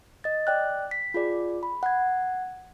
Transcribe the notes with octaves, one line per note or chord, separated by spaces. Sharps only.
D#5 A6
D5 G5 F#6
B6
F4 G#4 D5
B5
F#5 G#6